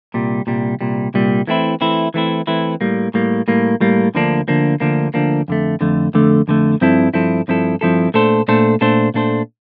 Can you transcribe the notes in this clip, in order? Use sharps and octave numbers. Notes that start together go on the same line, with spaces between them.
C2 A#2 G3
C2 A#2 G3
C2 A#2 G3
C2 A#2 G3
E3 A3 C4 E4
E3 A3 C4 E4
E3 A3 C4 E4
E3 A3 C4 E4
A2 G3 A#3
A2 G3 A#3
A2 G3 A#3
A2 G3 A#3
D2 D3 F3 A#3 D4
D2 D3 F3 A#3 D4
D2 D3 F3 A#3 D4
D2 D3 F3 A#3 D4
F2 D3 A3
F2 D3 A3
F2 D3 A3
F2 D3 A3
G2 F3 C4 E4 A4
G2 F3 C4 E4 A4
G2 F3 C4 E4 A4
G2 F3 C4 E4 A4
A#2 A3 D4 A4 C5
A#2 A3 D4 A4 C5
A#2 A3 D4 A4 C5
A#2 A3 D4 A4 C5